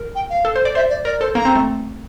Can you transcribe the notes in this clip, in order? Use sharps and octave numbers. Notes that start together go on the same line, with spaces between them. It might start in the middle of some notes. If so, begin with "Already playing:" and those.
Already playing: A#4
G5
F5
A4
C5
D5
C5 E5
D5
A#4 D5
A4 C5
A#3 A#5
C4
A3